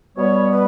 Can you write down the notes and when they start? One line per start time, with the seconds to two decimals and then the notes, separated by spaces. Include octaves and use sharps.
0.17 B2 G3 B3 C#5
0.50 B4